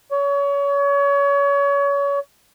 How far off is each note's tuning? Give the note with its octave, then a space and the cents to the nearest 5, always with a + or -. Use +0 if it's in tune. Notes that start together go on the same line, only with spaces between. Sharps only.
C#5 +30